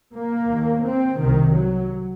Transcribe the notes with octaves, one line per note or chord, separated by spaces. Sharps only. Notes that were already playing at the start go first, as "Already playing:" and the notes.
A#3
D#2
C4
C2 C3 D#3
F#3